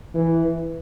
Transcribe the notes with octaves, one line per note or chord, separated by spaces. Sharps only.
E3